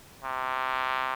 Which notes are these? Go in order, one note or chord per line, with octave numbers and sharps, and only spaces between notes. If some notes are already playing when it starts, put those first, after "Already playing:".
C3